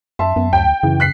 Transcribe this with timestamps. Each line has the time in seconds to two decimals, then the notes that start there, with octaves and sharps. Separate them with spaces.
0.19 F#2 E5 A5 C6
0.36 F#2 B3
0.53 D2 G5
0.83 F#2 C#3 E3
1.00 F#6 B6 C7